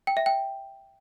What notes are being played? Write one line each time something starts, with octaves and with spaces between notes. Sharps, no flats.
G5
E5
G5